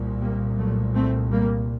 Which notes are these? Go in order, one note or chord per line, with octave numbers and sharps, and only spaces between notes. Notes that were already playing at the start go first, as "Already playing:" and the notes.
Already playing: C2 A#2
G3 A#3
F#3 A3
A3 C4
G3 A#3